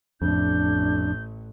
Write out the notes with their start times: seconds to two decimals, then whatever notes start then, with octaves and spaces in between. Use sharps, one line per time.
0.22 A1 F2 D4 G6